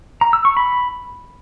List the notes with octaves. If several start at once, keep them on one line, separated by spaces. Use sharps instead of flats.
A#5
E6
C#6
B5